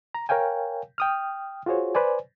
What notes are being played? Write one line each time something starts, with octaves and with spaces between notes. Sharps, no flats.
A#5
A#4 C#5 F5 G5 G#5
G5 D#6 F6
F4 F#4 G#4 C5 C#5
B4 C5 D5 G#5